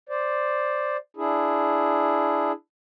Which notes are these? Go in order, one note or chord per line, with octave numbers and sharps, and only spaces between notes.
C5 D5
D4 E4 G#4